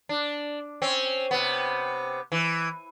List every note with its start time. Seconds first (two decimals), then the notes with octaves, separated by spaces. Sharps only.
0.09 D4
0.82 C4 C#4
1.31 C3 B3
2.32 E3